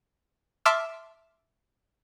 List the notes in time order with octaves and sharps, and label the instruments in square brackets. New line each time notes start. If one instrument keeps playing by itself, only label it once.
[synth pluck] E5 A5 C6 D6 E6 F6